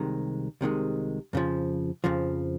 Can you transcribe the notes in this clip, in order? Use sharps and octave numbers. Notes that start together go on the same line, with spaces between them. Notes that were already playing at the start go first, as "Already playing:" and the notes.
Already playing: C2 C3 D#3 G#3
C2 C3 D#3 G#3
F2 C#3 F3
F2 C#3 F3